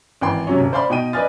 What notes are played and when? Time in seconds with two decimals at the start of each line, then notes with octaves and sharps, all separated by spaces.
0.21 G#1 E3 G5 C6
0.47 C3 F#3 C#4
0.60 D#1
0.73 C5 D5 F5 B5 C6
0.90 B2 D#4 G5 D#7
1.13 B4 D5 D#5 G#5 F6 A6